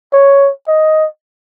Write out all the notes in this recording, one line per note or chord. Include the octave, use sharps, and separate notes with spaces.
C#5
D#5